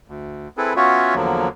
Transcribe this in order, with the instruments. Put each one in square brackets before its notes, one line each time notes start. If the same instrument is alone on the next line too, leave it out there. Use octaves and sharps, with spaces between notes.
[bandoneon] D2
C4 E4 G#4 A4 B4
B3 C#4 F4 F#4 C#5 E5
E2 D3 F3 F#3 A#3